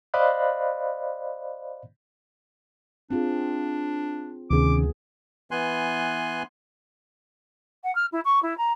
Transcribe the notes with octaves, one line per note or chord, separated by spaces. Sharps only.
C5 D5 D#5 F5 B5 F#6
C4 D4 F4 G#4
D2 C3 D#3 F3 B3 C#4 G#4 D6
E3 B3 G#5 C6 F#6
F#5
F6
E4
C#6
E4
A#5